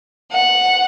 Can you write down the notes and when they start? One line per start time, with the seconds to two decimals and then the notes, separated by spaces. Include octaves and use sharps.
0.32 F#5